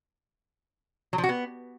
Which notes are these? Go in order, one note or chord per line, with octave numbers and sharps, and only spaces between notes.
F#3
F3
F#4
B3